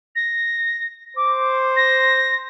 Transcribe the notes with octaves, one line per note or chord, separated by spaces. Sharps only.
A#6
C5 D6
A#6